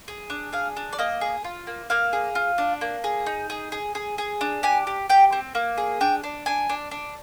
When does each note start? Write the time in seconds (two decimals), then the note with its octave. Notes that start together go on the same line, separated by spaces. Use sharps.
0.08 G#4
0.30 D4
0.53 G#4 F5
0.77 D4
0.93 D5
0.99 A#3 D#5
1.21 G#4
1.44 F4
1.67 A#3
1.90 A#3 F5
2.13 G#4
2.35 F4
2.58 D4
2.81 A#3
3.04 G#4
3.26 D#4
3.50 G#4
3.72 G#4
3.95 G#4
4.18 G#4
4.41 D4
4.63 G4 G#5
4.87 G4
5.09 G4 G5
5.33 C4
5.55 A#3
5.78 G#4
6.01 D4 G5
6.24 D4
6.46 D4 G#5
6.69 D4
6.91 D4